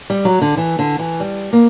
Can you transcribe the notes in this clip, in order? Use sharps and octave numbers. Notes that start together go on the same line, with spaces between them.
G3
F#3
D3
E3
D3
E3
G3
A#3